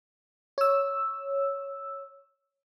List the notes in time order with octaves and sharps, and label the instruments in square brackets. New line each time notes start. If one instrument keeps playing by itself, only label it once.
[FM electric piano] C#5 E6